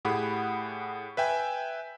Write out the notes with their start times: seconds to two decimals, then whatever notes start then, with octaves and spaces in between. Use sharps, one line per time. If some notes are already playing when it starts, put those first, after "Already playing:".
0.05 A2 G4 G#4 F#5 B5
1.17 B4 E5 G5 G#5